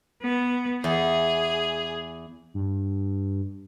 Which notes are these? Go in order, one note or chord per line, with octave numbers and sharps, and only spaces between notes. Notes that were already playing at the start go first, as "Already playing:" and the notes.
B3
E2 G#4
G2